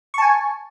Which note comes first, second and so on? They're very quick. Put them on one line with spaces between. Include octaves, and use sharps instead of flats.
C#6 A5 G#5